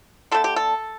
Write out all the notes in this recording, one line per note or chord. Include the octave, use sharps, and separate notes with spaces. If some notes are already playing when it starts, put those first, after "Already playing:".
D3 A3 A4
G4
A4